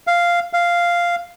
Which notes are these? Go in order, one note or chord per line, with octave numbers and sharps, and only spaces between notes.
F5
F5